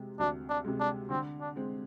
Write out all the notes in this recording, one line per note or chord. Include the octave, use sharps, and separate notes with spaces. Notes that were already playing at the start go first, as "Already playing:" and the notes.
Already playing: C3 G#3
D2 D4
D4
C3 G#3
D4
D3 C4
D4
G#3 C4